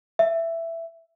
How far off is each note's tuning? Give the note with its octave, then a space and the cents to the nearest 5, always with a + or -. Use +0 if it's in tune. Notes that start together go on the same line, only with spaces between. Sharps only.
E5 +10